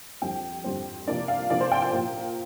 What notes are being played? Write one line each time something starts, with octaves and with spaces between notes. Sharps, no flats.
F2 D3 G3 C4 G5
F2 D3 G3 C4
C3 F3 A#3 D4 D5
F5
C3 F3 A#3 D4 D5
C5
G5
G5
A#2 F3 A#3